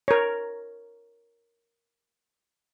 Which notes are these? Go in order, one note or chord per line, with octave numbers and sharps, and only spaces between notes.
A#4 C#5